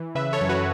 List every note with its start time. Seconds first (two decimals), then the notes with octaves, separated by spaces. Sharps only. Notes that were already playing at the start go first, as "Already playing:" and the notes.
Already playing: E3
0.15 C#3 B4 E5
0.33 A4 C#5
0.41 F#2
0.49 F#4 B4